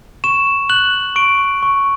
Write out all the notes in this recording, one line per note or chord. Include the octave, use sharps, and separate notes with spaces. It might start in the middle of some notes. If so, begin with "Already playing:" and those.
C#6 E7
F#6 F#7
C#6 D7
C#6